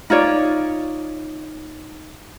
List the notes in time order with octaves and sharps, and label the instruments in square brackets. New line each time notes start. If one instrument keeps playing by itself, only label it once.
[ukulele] D#4 F4 C#5 D5